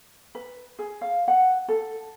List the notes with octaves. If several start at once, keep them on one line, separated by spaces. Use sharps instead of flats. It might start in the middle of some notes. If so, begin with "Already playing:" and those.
B4
G#4
F5
F#5
A4